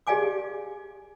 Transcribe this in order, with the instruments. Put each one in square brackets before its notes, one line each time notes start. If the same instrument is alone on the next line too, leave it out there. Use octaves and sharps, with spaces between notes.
[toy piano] G4 G#4 D5 F5 G#5 D6